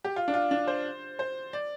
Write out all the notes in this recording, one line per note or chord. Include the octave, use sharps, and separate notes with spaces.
G4
F4
D4
F4
D4
C5
C5
D5